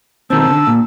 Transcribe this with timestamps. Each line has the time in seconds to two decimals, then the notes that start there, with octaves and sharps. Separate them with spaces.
0.30 B1 D#3 C4 A5 E6
0.50 D3
0.67 A#2